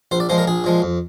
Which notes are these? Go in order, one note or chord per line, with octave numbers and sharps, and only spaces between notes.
A#1 C5
D5
A#2 F3 G#3 C5
A#4
A#1 G#4
A#2 F3 G#3
F2